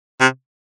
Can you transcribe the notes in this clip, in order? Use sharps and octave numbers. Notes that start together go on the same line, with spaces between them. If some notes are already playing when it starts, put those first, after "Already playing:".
C3